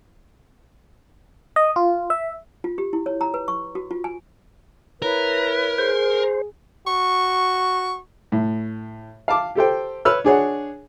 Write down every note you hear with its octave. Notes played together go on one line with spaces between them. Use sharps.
D#5
F4
E5
F4
G4
E4
C#5
A#5
B4
C#6
F#4
F4
G#5
E4 A#4 B4 C#5
G#4 C5
F#4 C#6
A2
F5 A5 D6
G4 A4 C5 G5
B4 C#5 E6 F6
D4 G#4 C#5 F#5